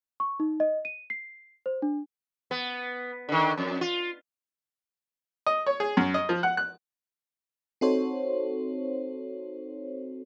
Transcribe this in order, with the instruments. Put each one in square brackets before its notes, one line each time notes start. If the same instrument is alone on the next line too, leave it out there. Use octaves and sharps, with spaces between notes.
[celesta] C#6
D#4
D#5
D#7
C7
C5
D4
[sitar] B3
D3 D#3
F2
F4
[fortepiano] D#5
C#5
G#4
F#2
D#5
F3
F#5
F#6
[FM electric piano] C4 D#4 F#4 A4 C5 C#5